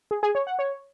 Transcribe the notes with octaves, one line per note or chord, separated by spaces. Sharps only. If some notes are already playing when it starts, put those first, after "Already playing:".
G#4
G#4
C#5
F#5
C#5